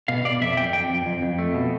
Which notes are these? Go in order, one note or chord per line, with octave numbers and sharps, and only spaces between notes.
B2 F5
B2 D5
F2 E5
F2 G5
F2 G5
F2
F2
F2
A3
B2